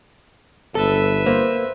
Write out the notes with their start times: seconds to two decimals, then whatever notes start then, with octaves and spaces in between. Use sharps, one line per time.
0.75 G1 A4 B4 E5
1.26 A#3 C5